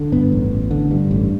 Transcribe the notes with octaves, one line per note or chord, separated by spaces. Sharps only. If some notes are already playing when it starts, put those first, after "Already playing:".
Already playing: D3
G2 B3
A1
A1
D3
G2
A1